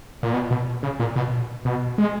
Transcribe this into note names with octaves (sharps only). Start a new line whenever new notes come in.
A#2
B2
B2
C#3
A#2
B2
B2
G#3